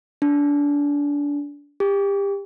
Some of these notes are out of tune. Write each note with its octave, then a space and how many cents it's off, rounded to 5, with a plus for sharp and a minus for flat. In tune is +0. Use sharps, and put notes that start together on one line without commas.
D4 -25
G4 +25